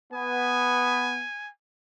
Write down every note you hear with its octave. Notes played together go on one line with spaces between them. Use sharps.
B3 G#5